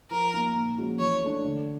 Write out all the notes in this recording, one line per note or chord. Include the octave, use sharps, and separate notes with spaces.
F3 A#4
A#3 D#4
A#2
F3 G#3 C#4 F#4
E3 C#5
A3 D4
D3